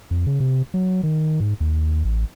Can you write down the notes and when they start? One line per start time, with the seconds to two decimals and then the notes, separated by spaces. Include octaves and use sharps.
0.11 F2
0.27 C#3
0.40 C3
0.74 F#3
1.03 D#3
1.40 G#2
1.60 D#2
2.05 A1